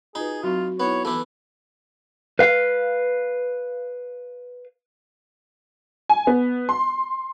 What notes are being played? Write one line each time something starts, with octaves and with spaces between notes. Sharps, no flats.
D#4 F4 F#4 G#4 B4
F#3 C4 F4 F#4 C#6
B3 D#4 E4 C#5
E3 A3 B3 E4 B4 D6
B4 F5
G#5
B3
C6